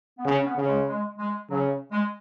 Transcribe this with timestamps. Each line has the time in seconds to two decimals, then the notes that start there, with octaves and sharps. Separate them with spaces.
0.18 B3
0.25 C#3 C#4
0.39 C#4
0.46 B3
0.57 C#3
0.68 G#3
0.88 G#3
1.18 G#3
1.50 C#3 F#3
1.92 G#3